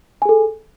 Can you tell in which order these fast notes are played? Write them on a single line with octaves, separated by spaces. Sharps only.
G#5 G#4 A4